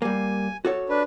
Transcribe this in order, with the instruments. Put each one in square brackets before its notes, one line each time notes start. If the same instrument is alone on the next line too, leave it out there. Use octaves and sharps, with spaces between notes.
[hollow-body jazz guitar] G3 A#3 [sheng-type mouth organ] G#5
[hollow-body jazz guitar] F#4 A4 C#5
[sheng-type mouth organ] D4 B4